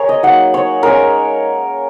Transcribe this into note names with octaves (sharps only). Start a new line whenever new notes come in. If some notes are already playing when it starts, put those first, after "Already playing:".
Already playing: G#4 A#4 C#5
D#5
F#3 A#3 D#4 F#5
C#5
G#3 C#4 A#4